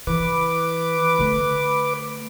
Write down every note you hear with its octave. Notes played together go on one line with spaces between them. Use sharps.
E3 B4 D6
D3 A3